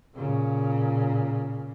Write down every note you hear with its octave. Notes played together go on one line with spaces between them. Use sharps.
A#2 C#3